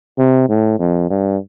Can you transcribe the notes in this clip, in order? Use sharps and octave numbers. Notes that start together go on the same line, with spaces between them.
C3
A2
F2
G2